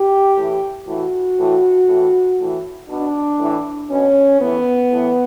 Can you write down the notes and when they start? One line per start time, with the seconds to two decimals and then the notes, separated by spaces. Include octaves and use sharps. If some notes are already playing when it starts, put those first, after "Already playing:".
Already playing: G4
0.37 A2 E3
0.87 A2 E3 F#4
1.37 A2 E3
1.87 A2 E3
2.39 A2 E3
2.89 B2 D4
3.39 A2 E3
3.89 B2 C#4
4.40 A2 E3 B3
4.90 A2 E3